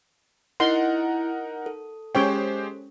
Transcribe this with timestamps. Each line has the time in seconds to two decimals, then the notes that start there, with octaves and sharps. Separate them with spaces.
0.60 D#4 E4 A#4 D#5 F#5 C6
1.66 A4
2.15 G#3 C#4 G4 C5 C#5 G5